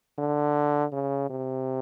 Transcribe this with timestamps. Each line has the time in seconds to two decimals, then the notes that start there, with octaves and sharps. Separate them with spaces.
0.18 D3
0.93 C#3
1.30 C3